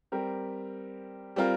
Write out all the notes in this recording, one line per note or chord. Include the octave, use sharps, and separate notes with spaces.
G3 C4 G4 A#4
G3 C4 F4 A#4